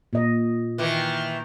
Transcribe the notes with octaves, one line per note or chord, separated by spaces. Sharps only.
A#2 D#5
D#3 E3